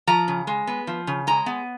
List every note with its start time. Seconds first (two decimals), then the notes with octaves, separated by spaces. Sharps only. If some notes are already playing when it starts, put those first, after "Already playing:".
0.07 F3 A#5
0.28 C#3
0.47 G#3
0.67 B3
0.87 F3
1.07 C#3
1.27 G#3 A#5
1.46 B3